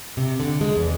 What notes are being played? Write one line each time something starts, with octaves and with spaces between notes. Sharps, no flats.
C3
D3
G#3
E2